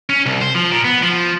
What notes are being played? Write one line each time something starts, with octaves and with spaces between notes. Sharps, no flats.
C#4
C2
C5
F3
A#2
B3
F3